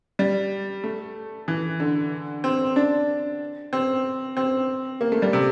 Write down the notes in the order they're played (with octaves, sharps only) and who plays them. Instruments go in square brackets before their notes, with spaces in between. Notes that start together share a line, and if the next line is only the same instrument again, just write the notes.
[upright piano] G3
A3
E3
D3
C4
D4
C4
C4
A#3
A3
G3
C3